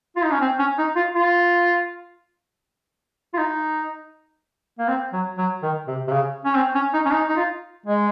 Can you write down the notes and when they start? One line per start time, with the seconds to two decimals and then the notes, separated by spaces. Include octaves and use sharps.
0.16 F4
0.24 D#4
0.33 C#4
0.41 C4
0.59 C#4
0.78 D#4
0.96 F4
1.15 F4
3.34 F4
3.38 D#4
4.79 A#3
4.88 C4
5.13 F#3
5.38 F#3
5.63 D#3
5.87 C3
6.08 C3
6.12 C#3
6.45 C#4
6.55 C4
6.75 C#4
6.94 D#4
7.05 C#4
7.11 D#4
7.29 D#4
7.37 F4
7.86 G#3